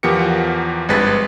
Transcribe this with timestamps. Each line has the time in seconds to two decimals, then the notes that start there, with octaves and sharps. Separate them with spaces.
0.03 E2 F3 B3 G4 A#4 C#7
0.89 G#1 G2 G#3 B4 A6 B6